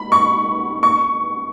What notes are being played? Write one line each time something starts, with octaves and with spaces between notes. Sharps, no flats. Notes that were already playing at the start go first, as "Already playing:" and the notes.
Already playing: B5
C#6
C#6